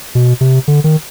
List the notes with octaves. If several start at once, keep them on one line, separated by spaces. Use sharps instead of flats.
B2
C3
D3
D#3